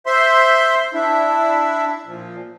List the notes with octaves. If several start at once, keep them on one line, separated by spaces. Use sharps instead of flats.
C5 E5 C6
D4 E4 E5
A#2 F3